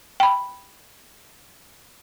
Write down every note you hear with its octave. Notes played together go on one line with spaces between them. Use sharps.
G5 B5